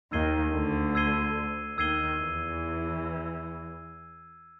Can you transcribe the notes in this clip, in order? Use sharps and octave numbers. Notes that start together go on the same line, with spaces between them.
D#2 D#3 E6 G#6 C7 D#7 G7
D2 D3
E6 G#6 C7 D#7 G7
D#2 D#3 E6 G#6 C7 D#7 G7
E2 E3